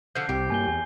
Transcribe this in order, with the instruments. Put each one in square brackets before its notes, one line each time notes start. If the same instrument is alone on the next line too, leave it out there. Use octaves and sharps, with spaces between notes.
[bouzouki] D3 F3 [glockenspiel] G6 C7
[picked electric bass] C2 C3 [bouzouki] G4
[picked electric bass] G2 A#3 [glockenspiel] G#5 G6 G7
[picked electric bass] E2 [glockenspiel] G#5